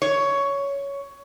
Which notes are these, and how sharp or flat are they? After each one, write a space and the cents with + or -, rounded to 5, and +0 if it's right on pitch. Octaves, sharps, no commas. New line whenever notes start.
C#5 +10